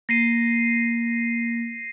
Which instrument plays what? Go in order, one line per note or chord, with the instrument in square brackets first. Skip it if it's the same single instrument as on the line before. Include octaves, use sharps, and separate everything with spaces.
[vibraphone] A#3 [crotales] A#6 C7 D#7